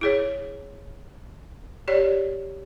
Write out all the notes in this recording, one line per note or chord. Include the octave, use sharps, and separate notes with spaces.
E4 G#4 C#5
G4 C#5 D5